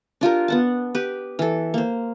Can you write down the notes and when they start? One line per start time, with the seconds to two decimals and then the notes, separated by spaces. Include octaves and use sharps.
0.21 D4 F4 G4 A#4
0.48 B3 F#5 A5
0.95 G4 B4
1.39 E3 A4
1.74 A#3 C5